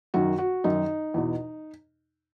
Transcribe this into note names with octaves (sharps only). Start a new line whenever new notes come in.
F#2 D#3 F#4
F#4
F#2 D#3 D#4
E2 B2